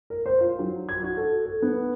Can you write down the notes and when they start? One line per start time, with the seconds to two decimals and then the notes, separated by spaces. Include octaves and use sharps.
0.10 A#4
0.26 C5
0.40 F4
0.59 F#3
0.89 G#6
1.03 F#4
1.17 A4
1.46 A4
1.62 B3